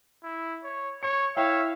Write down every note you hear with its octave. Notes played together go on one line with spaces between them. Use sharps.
E4
C#5
C#5 C#7
E4 C#5 E5 F5 G5